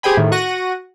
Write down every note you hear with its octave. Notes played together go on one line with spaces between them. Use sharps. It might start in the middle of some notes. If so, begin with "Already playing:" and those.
G4 G#4 C5 G5 G#5 B5
A2 D#3
F#4 F#5 C#6 A#6 D#7